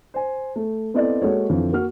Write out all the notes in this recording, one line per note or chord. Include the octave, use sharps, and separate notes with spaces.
C5 G#5
A3
B3 C4 E4 A4 D5 D#5
G#3 A#3 F#4 A4 C#5
F2 D3 E3
A#3 F#4 F6